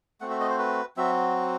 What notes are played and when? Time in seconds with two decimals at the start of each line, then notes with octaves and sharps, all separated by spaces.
0.21 A3 C4 F#4 F#5
0.30 E5
0.40 D#5
0.49 C5
0.59 B4
0.97 F#3 C4 F#4 E5